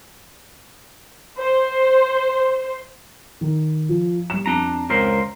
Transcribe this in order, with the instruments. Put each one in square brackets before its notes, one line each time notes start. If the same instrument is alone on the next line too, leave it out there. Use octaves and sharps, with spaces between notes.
[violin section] C5
[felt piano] D#3
F3
G3 E7
[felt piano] F2 [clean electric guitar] D4 A#5
[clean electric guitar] C#2 A#4 C5